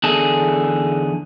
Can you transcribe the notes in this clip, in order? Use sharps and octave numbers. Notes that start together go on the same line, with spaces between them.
E2 D3 G#4 A5